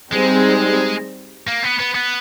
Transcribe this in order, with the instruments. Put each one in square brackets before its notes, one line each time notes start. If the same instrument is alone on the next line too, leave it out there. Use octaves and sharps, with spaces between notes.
[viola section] G3 C4 D#4 G#4 [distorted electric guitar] G#3
[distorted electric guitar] A#3
B3
B3
B3